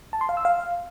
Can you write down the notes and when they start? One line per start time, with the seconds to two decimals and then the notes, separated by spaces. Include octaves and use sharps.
0.13 A5
0.21 C6
0.29 F5
0.37 E6
0.45 F5